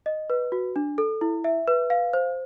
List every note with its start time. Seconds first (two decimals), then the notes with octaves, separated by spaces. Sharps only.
0.06 D#5
0.30 B4
0.52 F#4
0.76 D4
0.98 A4
1.21 E4
1.44 E5
1.68 B4
1.90 F5
2.13 C5